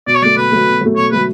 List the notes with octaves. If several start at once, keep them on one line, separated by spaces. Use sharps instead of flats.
B2 D5
C#5
F#3 A3 D5
B2 B4
F#3 A3
B2
F#3 A3
B2 C#5
F#3 A3 B4